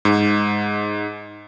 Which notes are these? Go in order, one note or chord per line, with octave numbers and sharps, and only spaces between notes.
G#2